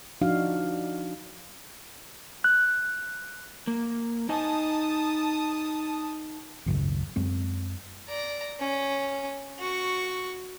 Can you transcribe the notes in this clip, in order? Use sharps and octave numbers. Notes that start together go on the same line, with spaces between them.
F3 D4 D#4 F#4 F5
F#6
A#3
D#4 D#5 G#5 A5 D#6
G#1 C#2 F#2 C#3
F#2 G#3 C4
D5 A#5
C#4
F#4 C#6